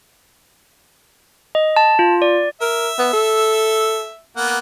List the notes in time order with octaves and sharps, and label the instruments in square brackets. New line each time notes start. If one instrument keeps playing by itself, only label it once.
[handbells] D#5
A5
F4
D5
[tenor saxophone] A#4 [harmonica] E5
[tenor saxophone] B3
A4
[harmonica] A#3 B3 F#5